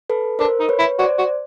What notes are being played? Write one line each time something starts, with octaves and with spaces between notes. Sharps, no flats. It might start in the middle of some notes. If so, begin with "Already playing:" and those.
A4 B4
D4 A#4 C5
D#4
B4 C#5
E4
F#4 C5 D5
F#4